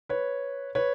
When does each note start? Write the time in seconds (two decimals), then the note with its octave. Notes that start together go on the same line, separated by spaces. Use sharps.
0.09 B4 C#5
0.75 B4 C#5